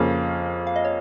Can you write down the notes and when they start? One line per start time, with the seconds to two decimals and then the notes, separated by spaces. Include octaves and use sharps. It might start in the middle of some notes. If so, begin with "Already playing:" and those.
Already playing: F2 C#3 A#3 C#4 F5
0.67 F5
0.76 D#5
0.85 C#5